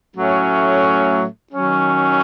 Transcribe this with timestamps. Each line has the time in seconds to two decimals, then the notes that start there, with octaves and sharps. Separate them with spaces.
0.14 A2 F#3 A3 C#4
1.53 D#3 F#3 C#4